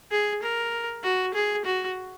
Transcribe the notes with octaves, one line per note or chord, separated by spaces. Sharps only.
G#4
A#4
F#4
G#4
F#4